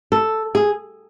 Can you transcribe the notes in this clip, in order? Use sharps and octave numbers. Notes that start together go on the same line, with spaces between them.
A4
G#4